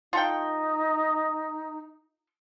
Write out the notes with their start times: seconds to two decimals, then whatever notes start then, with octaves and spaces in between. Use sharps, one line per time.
0.13 D#4 F4 A4 G5